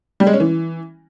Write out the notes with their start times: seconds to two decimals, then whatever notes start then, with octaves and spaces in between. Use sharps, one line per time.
0.20 G3
0.27 G#3
0.33 C#4
0.40 E3